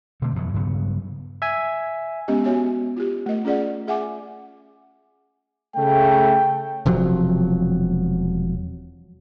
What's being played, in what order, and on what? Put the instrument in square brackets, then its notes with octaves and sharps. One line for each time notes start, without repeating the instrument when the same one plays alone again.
[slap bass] B2 D3 A3 C4
F2 B2 E3 F#3
G2 C#3 F#3 B3
[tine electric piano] E5 G#5
[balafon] G#3 B3 C#4 G4 D#5
B3 F#4 C#5 E5 G#5
F4 G4
A3 A#4 D#5
C#4 F4 G#4 D5 F#5
G#4 E5 F#5 G#5 D6
[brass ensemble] C#3 A3 [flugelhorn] G5
[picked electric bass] E1 C3 F3 F#3